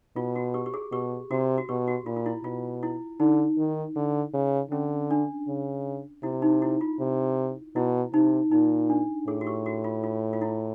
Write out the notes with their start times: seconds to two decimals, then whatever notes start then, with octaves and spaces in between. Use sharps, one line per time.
0.16 B2 F4
0.36 F#4
0.54 G4
0.66 G4
0.74 G#4
0.92 B2 G4
1.31 C3 F#4
1.58 F#4
1.69 B2 G4
1.87 F#4
2.06 A#2 F4
2.16 F4
2.26 E4
2.44 B2 F4
2.83 E4
3.20 D3 D#4
3.58 D#3
3.96 D3
4.34 C#3
4.71 D3 C#4
5.11 D4
5.48 C#3
6.23 C3 E4
6.42 D#4
6.62 E4
6.81 F4
7.00 C3
7.76 B2 E4
8.13 C3 D#4
8.51 A#2 D#4
8.90 D4
9.27 A2 G#4
9.41 F#4
9.47 G4
9.66 F#4
9.84 F4
10.04 F4
10.33 F4
10.41 E4